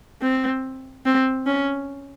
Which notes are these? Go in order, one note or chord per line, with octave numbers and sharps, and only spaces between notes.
C4
C4
C#4